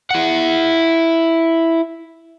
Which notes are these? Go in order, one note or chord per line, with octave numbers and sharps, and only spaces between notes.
E4 F#5